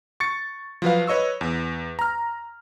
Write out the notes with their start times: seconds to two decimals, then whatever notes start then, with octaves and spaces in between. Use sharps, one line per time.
0.20 C#6 A6 C#7
0.82 F3 F#3 B4 F5
1.07 B4 C#5 D#5 C#6 E6
1.41 E2
1.99 A#5 F6